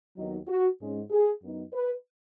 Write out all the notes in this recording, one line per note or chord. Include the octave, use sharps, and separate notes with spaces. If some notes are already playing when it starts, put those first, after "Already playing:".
D#2 D#3 F#3 B3 D#4
F#4
G#2 G#3 C#4
G#4
F#2 F#3 B3 D#4
B4